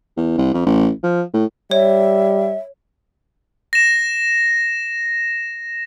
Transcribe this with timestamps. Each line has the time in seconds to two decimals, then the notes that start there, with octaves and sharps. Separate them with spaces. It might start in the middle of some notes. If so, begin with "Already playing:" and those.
0.17 E2
0.38 C2
0.54 F2
0.66 A1
1.03 F3
1.34 A2
1.71 G3 C#5 E5
3.73 A#6 E7